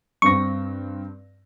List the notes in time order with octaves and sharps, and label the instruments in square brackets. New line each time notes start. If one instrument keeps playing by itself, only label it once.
[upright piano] G2 C4 A#6 [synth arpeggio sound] C#6